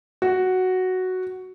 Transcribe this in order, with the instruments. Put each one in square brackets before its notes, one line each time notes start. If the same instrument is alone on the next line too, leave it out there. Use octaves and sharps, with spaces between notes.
[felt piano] F#4